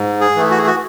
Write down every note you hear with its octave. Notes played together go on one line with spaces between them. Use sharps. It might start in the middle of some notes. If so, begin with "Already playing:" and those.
Already playing: G#2
G#4
E3 A3
F#4
G#4
F#4